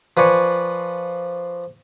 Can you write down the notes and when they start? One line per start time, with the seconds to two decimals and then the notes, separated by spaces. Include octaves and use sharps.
0.17 F3 B4 D5 G#5 C#6